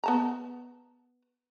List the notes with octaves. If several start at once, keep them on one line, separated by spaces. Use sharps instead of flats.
B3 A5 A#5